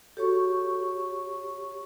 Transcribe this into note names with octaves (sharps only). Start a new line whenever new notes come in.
F#4 G4 A4 C#5 C#6